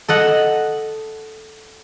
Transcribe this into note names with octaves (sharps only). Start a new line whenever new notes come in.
A4 D#5 F#5